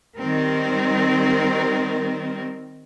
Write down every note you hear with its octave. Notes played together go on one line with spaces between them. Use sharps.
D#3 G3 C4 A#4